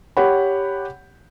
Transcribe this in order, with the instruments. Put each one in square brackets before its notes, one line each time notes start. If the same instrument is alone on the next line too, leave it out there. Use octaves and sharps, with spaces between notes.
[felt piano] G4 C#5 F#5 B5